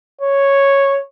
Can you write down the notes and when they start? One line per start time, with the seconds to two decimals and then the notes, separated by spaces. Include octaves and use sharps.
0.21 C#5